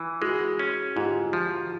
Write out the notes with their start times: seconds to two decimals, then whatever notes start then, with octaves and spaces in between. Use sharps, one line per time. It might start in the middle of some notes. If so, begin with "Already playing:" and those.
Already playing: E3
0.21 G#3 F#4 G#4
0.59 C#4
0.96 G#2 F4 G4
1.33 F3